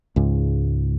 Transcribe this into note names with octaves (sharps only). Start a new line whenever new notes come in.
C#2 G#2